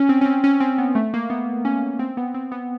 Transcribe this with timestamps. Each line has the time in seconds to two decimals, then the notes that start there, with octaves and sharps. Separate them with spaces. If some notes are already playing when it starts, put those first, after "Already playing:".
Already playing: C#4
0.09 C4
0.21 C#4
0.26 C4
0.44 C#4
0.60 C4
0.78 B3
0.95 A3
1.14 A#3
1.30 B3
1.65 C#4
1.99 C4
2.17 B3
2.34 C4
2.52 B3